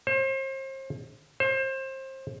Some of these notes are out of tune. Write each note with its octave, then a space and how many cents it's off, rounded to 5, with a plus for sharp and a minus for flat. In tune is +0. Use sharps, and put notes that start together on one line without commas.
C5 +35
C5 +25